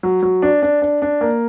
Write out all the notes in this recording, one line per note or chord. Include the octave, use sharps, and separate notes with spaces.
F#3
F#3
D4
D4
D4
D4
A#3